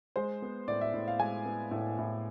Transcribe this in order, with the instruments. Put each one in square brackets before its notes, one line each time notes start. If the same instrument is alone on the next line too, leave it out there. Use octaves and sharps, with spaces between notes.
[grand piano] G#3 C5
B3
A2 D5
E5
A2
F5
G#3 G#5
B3
A2
A2